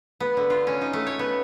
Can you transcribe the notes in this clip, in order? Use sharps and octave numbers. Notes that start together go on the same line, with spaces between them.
B3
D3
F4
C#4
D#4
A3
C#5
B3